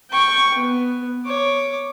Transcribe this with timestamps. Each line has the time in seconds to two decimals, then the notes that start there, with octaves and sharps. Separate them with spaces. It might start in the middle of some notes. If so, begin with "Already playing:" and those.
0.11 G5 C#6
0.54 B3
1.26 C#5 D6